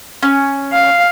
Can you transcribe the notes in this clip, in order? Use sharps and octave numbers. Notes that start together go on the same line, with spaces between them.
C#4
F5